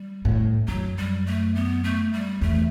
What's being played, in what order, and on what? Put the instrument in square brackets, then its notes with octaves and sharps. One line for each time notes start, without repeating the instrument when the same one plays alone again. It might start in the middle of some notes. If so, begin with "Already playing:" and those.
Already playing: [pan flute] G3
[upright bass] A2
[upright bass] F#2 [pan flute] F#3
[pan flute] G3
A3
B3
A3
G3
[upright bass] E2 [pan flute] A3